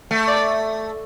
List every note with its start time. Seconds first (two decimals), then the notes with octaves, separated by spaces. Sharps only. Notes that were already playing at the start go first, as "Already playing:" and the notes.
0.11 A3
0.28 D5